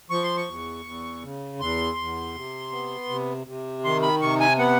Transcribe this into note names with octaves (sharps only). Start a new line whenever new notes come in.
F3 C#6
C6
C#6
E2
E2
C#3
E2 C6
E2
C3
B3
C3
C3
D#3 C6
B5
C3 C#6
G#5
B3 F#5